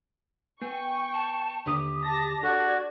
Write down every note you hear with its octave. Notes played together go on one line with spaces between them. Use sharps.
B3 G5 G#5 C#6
A5
D#2 D3 G4 D#6
A5 A#6
D4 F#4 A4 D5 G#6